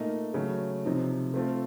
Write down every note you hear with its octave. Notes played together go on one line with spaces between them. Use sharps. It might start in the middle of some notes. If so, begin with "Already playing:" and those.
Already playing: A#2 A3 D#4 A#4 D#5
C#3 F#3 A3
C3 F3 C4 D#4
A3 C4 F4 A4